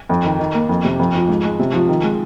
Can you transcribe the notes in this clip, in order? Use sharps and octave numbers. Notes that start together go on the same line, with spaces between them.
F2
D#3
D#3
A#3
F2
C3
F2
F3
G#2
G#3
C3
F3
D#3
G#3